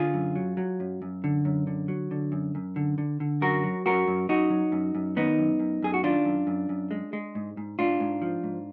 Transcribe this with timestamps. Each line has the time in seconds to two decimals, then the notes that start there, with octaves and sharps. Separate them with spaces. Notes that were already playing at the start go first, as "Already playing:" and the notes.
Already playing: D3 F4 G#4
0.14 F#2
0.35 F#3
0.57 F#3
0.80 F#2
1.02 F#2
1.24 D3
1.45 F#2
1.67 D3
1.88 F#3
2.11 D3
2.32 F#2
2.55 F#2
2.76 D3
2.98 D3
3.20 D3
3.41 F#2 F#4 A#4
3.64 F#3
3.86 F#2 F#4 A#4
4.07 F#2
4.29 F#2 D#4 F#4
4.50 F#3
4.72 F#2
4.95 F#2
5.16 D#3 B3 D#4
5.38 F#2
5.59 F#2
5.82 F#2 G#4
5.94 F#4
6.03 D#3 D4 F4
6.25 F#2
6.47 F#2
6.69 F#2
6.91 G#3
7.13 G#3
7.35 G#2
7.57 G#2
7.79 G#2 D4 F4
8.00 G#2
8.22 F3
8.43 G#2